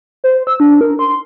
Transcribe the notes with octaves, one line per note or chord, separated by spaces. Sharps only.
C5
E6
D4
A#4
C6